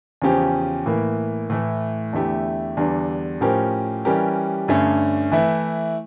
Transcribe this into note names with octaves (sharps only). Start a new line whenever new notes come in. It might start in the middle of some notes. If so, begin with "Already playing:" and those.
E2 C#3 F3 C#4 G4
A2 E3 A#3
A2 E3 A3
E2 D3 A3 E4 G4
E2 D3 G3 D4
A2 F3 C#4 G4 A#4
E3 G3 C#4 G4 A#4
G2 D3 A3 C#4
E3 A3 E4